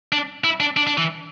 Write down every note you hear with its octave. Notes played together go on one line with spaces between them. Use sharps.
D4
E4
D4
D4
D4
E3